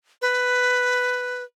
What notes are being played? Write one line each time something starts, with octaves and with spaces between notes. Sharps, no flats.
B4